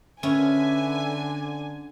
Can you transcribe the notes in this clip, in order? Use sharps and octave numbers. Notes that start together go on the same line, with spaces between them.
D3 C#4 B4 E5 G#5